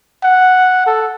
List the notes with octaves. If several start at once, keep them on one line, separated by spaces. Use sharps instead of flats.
F#5
A4